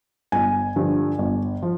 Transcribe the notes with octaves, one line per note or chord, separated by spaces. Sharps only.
G1 G#5
G2 D3 F3
G1
F3